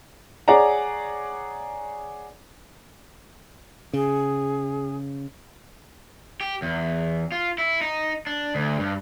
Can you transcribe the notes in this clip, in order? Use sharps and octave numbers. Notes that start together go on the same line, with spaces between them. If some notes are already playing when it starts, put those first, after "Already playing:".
G#4 C#5 D5 F#5 A#5
C#3 G#4
G4
E2
F4
E4
D#4
D4
D2
G2